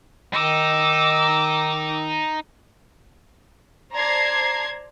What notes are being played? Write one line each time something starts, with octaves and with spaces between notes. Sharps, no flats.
D#3 D#4 D6 E6
C5 D5 A5 A#5 G#6 C7